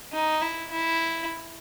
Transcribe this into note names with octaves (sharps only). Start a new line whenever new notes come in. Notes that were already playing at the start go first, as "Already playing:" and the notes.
D#4
E4
E4